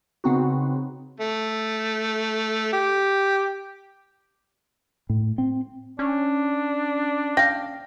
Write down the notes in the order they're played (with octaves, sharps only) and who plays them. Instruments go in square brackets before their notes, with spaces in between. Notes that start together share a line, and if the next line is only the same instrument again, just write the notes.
[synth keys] C#3 B3 C4 D#4 F#4
[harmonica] A3
G4
[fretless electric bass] A2
C4
[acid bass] C#4 [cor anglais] D4
[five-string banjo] F5 G5 [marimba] A#6